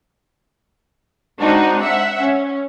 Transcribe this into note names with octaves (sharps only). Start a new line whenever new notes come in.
G#3 C4 D4 D#4 F#4
E5 F#5
C#4